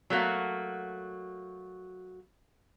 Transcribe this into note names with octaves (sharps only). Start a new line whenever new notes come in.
F#3 A3 A#3 F#4